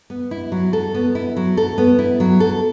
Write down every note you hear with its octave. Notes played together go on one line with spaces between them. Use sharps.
B3
E4
F#3
A4
B3
E4
F#3
A4
B3
E4
F#3
A4